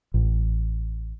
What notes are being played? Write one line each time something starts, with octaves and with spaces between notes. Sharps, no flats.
A1